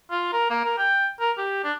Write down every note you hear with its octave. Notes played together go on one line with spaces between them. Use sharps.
F4
A#4
A#3
A#4
G5
A#4
G4
D4